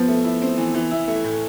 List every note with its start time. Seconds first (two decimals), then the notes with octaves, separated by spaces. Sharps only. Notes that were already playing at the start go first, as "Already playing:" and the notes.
Already playing: F3 B3
0.08 A3
0.24 E4
0.42 C4
0.58 E3
0.74 E3
0.91 E4
1.08 A3
1.24 A2